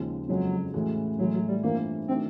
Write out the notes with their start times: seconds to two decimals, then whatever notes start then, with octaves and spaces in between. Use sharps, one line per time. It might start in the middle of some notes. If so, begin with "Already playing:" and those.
Already playing: D#2 C#3 F3 G#3
0.29 F#1 F2 C#3 F3 F#3 G#3
0.74 A2 E3 G#3 C#4 F#4
1.19 A2 E3 F#3 G#3
1.33 F#3
1.48 G3
1.63 G2 E3 A3 A#3 C4 F4
2.08 D#3 F#3 A3 C4 D4